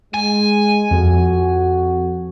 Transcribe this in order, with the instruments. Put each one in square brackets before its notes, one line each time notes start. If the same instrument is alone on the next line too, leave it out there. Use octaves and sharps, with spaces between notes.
[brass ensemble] G#3 [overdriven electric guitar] G#5
[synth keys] F2 [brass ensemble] F#4